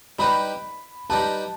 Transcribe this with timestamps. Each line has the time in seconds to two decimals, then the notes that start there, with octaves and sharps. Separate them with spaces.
0.19 G3 D#4 G4 B4 B5
1.10 G3 D#4 G4 B4 A5